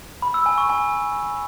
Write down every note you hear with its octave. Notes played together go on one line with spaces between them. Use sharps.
B5
E6
G#5
C#6
G#5